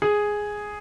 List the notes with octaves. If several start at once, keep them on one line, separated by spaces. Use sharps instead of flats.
G#4